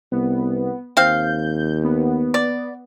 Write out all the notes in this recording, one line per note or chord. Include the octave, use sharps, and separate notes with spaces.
C2 B3
D#2 C4 F5 G6
B3
D5